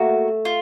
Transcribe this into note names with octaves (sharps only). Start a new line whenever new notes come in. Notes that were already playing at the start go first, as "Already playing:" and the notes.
Already playing: A3 A#3 F#4
F4